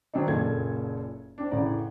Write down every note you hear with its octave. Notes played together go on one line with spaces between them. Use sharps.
D#3 F#3 C4 D4 D#4
F#1 A#2 A4 G#6
C4 D4
A1 C#3 E3 A3 D5 A#5